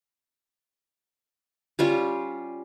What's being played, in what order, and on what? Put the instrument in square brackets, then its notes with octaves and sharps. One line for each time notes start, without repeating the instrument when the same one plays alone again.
[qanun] G3 C#4 F4